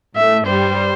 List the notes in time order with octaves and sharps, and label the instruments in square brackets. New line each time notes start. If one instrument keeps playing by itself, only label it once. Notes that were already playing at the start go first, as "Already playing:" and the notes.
[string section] A2 A3 [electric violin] E5
[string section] G2 G3 [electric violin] C5